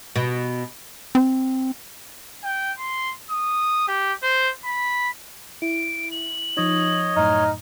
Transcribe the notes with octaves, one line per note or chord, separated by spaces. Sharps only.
B2
C4
G5
C6
D#6
G4
C5
B5
E4 D7
F#7
F3 D#4 C#5 D#5
F#2 A2 D#4 F6